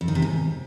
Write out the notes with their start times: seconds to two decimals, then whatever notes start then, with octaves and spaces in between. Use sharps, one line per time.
0.01 F2
0.08 D#3
0.15 C3
0.22 G#2